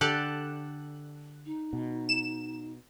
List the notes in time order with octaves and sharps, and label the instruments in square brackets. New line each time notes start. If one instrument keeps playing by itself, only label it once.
[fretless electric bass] D3 [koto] G4 A4 D5 [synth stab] F#6
[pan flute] D#4
[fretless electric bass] B2
[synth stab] E7